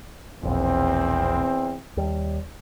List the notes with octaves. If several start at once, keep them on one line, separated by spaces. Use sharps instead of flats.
E1 A#1 E2 C4
D#2 G3